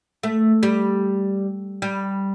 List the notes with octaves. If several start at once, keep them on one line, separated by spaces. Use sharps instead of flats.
A3
G3
G3